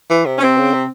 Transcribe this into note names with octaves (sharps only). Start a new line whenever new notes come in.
E3
C3
C#4
C3 C4
C#3
C3